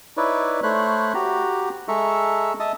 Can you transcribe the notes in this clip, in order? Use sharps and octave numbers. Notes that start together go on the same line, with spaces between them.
D#4 E4 B4 C#5 D5
A3 C5 C#5 B5 F#6
F#4 G4 A#5
G#3 A4 E5 A#5 C#6
D#5 E5 A5 D#6